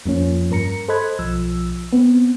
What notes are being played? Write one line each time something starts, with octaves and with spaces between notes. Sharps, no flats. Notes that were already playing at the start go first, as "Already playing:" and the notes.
F2 F3 A#3 C#4
G2 A#4 A#5 C#7
A4 C5 D#5 B5 F#6 G#6
B1 F3 E6
B3 C4